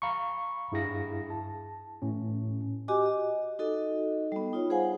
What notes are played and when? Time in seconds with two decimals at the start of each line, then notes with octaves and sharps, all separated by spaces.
0.02 F5 A#5 B5 C#6
0.72 G2 E4 G#4 F5 A#6
1.30 A5
2.02 A2 C#4
2.88 F#4 G4 D#5 G#5 D6
3.06 D#5
3.59 D#4 F#4 A4 D#5
4.32 G3 B3
4.53 D#4 F4 C#5
4.70 G#4 C5 F5 F#5 G#5